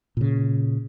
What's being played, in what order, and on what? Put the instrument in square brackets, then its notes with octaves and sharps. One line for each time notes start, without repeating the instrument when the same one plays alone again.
[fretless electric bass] A#2 C#3